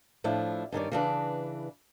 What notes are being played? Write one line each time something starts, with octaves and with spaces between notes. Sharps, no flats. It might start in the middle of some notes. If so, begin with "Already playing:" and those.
A2 F3 D4 E4
G2 D#3 C#4 D5
C#3 E3 D4 B4